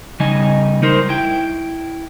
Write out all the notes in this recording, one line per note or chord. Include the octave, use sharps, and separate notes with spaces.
C#3 G3 D#4 D#5 G#5
G3 D#4 A#4 C5
E4 G5